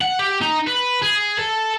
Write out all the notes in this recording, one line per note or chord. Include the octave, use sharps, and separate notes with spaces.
F#5
G4
D#4
B4
G#4
A4